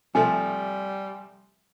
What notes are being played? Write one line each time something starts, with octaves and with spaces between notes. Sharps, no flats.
C3 F3 G3 A3 G#5